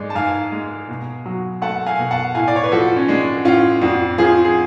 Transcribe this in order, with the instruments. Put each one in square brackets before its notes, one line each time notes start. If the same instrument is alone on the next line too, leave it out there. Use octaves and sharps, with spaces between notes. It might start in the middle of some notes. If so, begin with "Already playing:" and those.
Already playing: [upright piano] G#2 G#3 D5
A5
G#2 F5 G#5
G#3
B2
F#3
A3 F#5 A5
F5 G#5
B2
F#5 A5
A2 F5 G#5
D5
C#5
B4
F3 F#4 A4
C#4
G#3 D4
A2 C#4 F4
F2 D4 F#4
F3 F4 G#4
G#4